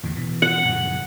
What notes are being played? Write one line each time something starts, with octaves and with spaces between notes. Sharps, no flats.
E2 A2 D3
B2 E3
F#5
A#1 F#2 C#3